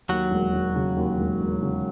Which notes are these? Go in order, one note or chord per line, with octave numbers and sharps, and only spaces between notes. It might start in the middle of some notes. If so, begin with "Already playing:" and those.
D#2 F#3 F#4
E1
E1
C#3
D#2
E1
E1
C#3